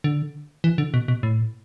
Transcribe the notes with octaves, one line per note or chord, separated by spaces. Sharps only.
D3
E3
D3
B2
B2
A2